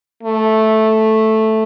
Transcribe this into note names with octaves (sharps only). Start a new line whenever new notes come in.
A3